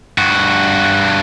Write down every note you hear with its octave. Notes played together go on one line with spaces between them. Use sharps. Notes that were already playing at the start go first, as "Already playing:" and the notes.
G2 F#4